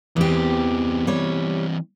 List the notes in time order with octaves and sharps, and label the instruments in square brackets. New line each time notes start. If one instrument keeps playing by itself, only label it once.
[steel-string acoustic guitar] E2 G4 [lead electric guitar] E3 C4
[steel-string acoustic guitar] G3 C#5